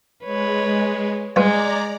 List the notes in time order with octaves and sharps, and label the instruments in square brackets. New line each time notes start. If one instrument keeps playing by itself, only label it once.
[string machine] G#3 [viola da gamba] B4 C#5
[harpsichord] G3 F4 B4 [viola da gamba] G#3 [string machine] D5 A#5 D6